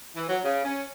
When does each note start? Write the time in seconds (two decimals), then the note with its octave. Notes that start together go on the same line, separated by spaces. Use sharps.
0.15 E3
0.28 F#3
0.44 C#3
0.65 C#4